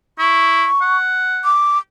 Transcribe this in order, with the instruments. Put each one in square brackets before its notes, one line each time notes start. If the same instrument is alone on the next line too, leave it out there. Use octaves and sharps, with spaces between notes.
[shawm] E4 [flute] C#6
[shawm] F#5
[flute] D6